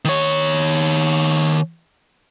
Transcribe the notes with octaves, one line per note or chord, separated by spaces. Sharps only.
D#3 C#5